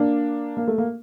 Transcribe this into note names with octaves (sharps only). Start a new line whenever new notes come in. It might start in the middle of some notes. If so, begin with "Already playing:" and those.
Already playing: A#3 D4
A#3
A3
A#3